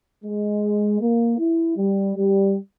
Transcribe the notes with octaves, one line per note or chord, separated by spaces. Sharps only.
G#3
A#3
E4
G3
G3